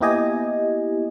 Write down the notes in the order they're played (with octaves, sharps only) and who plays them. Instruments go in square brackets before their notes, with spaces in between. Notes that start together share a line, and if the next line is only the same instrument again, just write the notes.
[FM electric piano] A#3 B3 E4 G4 D#5 G#5